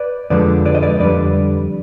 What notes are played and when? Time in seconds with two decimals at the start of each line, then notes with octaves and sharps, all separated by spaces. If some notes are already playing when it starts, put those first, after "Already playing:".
Already playing: B4 D5
0.30 F2 D3 F3 G#3 B4 D5
0.65 B4 D5
0.75 D#5
0.83 B4 D5
1.00 F2 D3 G3 B4 D5